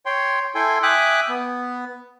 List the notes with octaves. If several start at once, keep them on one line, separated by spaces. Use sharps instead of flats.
C#5 G5 C6
E4 A4 G5 G#5 C6
E5 G5 G#5 D6 D#6 F#6
B3